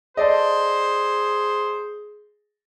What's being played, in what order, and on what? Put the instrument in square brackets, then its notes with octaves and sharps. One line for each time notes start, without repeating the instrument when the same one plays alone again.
[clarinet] G#4 [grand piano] A4 D5 D#5 [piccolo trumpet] C5